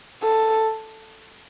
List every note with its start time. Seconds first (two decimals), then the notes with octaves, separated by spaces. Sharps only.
0.23 A4